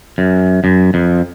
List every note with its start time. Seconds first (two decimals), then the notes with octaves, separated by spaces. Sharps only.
0.18 F#2
0.64 F#2
0.94 F2